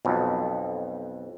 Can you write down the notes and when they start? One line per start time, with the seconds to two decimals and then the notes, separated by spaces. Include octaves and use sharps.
0.05 B1 F2